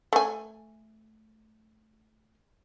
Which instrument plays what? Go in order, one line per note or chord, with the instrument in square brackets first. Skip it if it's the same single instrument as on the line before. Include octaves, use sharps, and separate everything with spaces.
[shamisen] A3 G#5